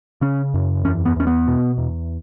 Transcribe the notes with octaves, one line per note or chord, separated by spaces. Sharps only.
C#3 C#4
F#2
E2 C#4
B3
E2 C#4
B3
B2
E2